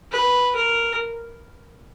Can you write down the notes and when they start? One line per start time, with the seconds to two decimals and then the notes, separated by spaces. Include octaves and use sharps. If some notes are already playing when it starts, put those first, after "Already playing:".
0.12 B4
0.55 A#4